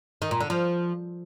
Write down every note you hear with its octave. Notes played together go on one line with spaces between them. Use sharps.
D#3
A#2
D3
F3